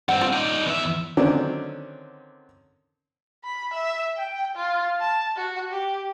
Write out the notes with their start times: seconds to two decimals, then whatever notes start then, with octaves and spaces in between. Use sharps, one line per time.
0.09 G2 C4 F#5
0.21 F4
0.33 D#4 D5
0.66 E2 E5
1.17 D3 D#3 F#3 C4 C#4 D5
3.44 B5
3.73 E5
4.17 G5
4.56 F4
5.00 A5
5.36 F#4
5.72 G4